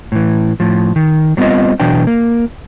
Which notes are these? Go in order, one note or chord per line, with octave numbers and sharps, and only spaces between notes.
A2 E3
A2 F3
D#3
F#3 G3 B3 C4 F4 D#5
B2 E3 F#3 D4 G5
A#3